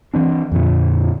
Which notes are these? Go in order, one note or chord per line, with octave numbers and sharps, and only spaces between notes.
E3 C4 D4
F2 A#2 D3 F3